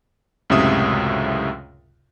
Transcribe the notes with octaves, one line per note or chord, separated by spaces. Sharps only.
C#2 F#2 A2 C3 E5 D#6